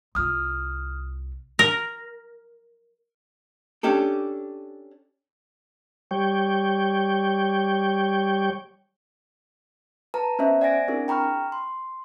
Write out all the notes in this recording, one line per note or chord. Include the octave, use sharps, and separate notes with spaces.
C2 F4 D#6 F6
A#4
C#4 D4 G4 A4
G3 C#5 G5
B4 A5 A#5
B3 C#4 C5 D#5 E5
D5 F#5 G#5 A6 A#6 D7
C4 D4 E4 G#4 A#4
G5 A#5 B5 C#6 F6
C6